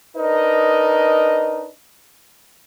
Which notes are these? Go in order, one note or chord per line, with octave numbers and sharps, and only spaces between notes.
D4 D#4 A#4 B4 D#5